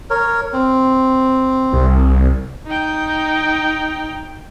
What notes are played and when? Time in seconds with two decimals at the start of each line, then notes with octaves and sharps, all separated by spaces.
0.10 A#4 C#5
0.53 C4
1.73 C2
2.67 D#4 G5